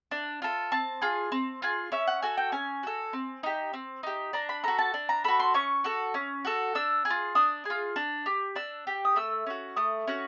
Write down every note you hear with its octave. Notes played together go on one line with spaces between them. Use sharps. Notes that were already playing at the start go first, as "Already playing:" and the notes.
D4
F4 A4
C4 A5
F4 G#4
C4
F4 G#4
C#4 E5
F#5
F#4 A4 G#5
G5
C#4 G#5
F#4 A4
C4
D#4 G4
C4
D#4 G4
D4 A#5
B5
F#4 A4 A#5
A5
D4
A#5
F#4 A4 B5
C6
C#4 C#6
F#4 A4
C#4
F#4 A4
D4 E6
G#4
F4
D4 D#6
F4 G#4
D4
G4
D4 E6
G4
D#6
A3 E6
C#4 F#4
A3 D#6
C#4 F#4